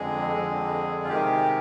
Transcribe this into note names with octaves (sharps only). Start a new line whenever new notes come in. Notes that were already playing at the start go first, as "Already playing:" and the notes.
Already playing: F2 D3 G#3 G#4
F2 D3 G#3
F4
C3 D#3 G#3 G4